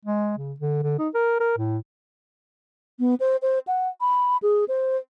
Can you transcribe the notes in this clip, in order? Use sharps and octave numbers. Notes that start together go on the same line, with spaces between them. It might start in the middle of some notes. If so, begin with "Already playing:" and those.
G#3
C#3
D3
D3
D#4
A#4
A#4
A2
B3
C5
C5
F#5
B5
G#4
C5